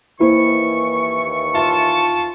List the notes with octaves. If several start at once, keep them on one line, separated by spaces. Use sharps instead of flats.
D#2 E3 A#3 E4 C5 C#6
F4 E5 A5